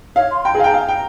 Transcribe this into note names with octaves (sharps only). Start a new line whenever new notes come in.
C#5 F5
C6
C6
G5 A#5
G#4 F5
G5 G#5
F5 A#5
G5